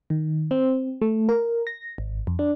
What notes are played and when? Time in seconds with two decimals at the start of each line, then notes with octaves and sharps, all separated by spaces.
0.10 D#3
0.51 C4
1.01 A3
1.29 A#4
1.67 A#6
1.98 G#1
2.27 F2
2.39 D4